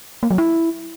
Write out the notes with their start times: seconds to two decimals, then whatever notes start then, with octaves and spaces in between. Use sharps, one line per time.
0.23 A#3
0.30 F#3
0.38 E4